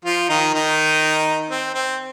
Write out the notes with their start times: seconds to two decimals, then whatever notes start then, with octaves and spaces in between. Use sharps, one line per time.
0.05 F3 F4
0.29 D#3 D#4
0.54 D#3 D#4
1.50 C4
1.74 C4